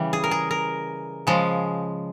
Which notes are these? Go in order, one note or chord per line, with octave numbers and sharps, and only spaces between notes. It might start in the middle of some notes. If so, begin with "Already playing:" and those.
Already playing: C#3 E3 G3
G#4
A#4
G#4
A#4
C#3 F3 G#3